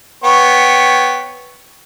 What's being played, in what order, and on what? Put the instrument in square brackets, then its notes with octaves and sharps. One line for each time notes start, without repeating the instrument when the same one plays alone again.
[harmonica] B3 C#5 G5